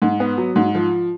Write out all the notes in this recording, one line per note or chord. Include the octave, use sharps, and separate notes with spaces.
G#2
B3
F#3
G#2
F3